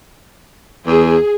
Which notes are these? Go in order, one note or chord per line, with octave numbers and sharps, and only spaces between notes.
E2 G#4